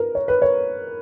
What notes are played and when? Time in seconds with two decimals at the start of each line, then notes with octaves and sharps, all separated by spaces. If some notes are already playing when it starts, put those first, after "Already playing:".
Already playing: A#4 B4
0.15 C#5
0.28 B4
0.42 C#5